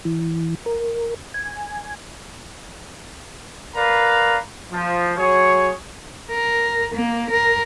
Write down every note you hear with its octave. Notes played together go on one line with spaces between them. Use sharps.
E3
A#4
G#5
A#4 B4 D5 F5 A#5
F3
F#3 G#4 C#5
A#4
A#3
A#4